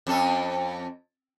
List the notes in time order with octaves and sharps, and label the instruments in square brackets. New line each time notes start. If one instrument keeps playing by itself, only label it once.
[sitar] F2 C#4 A4